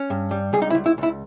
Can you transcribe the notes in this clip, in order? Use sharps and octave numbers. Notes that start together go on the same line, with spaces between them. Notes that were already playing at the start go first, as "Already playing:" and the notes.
Already playing: C#4
G2
G3
C#2 G#4
D#4
E4
C#2
E4
C#2 E4